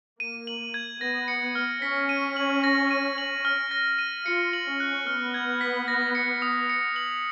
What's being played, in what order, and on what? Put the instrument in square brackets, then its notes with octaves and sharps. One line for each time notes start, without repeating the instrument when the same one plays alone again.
[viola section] A#3 [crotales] D#7
[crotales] F#7
G#6
[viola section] B3 [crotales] A#6
[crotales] C#7
F6
[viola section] C#4 [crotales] B6
[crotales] D#7
F#7
A#6
D#7
F#7
F6
A#6
D#7
[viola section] F4 [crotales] C#7
[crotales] F#7
[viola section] C#4
[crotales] F#6
[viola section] B3 [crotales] F6
[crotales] G#6
B6
A#6
C#7
D#6
C#7
F#7